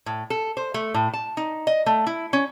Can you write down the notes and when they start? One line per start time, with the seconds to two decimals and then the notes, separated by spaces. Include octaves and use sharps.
0.06 A2
0.30 A4
0.57 C5
0.74 A3
0.94 A2
1.14 A5
1.37 D#4
1.67 D#5
1.86 A3
2.07 E4
2.33 C#4